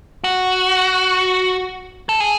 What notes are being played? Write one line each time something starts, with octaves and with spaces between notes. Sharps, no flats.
F#4
A4
G#4